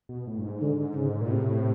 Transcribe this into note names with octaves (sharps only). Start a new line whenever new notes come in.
B2
A2
G2
G#2
D3
C#3
A#2
A2 C3